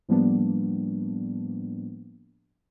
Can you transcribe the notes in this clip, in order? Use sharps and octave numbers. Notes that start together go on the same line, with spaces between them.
A2 F3 G3 A#3 B3 D4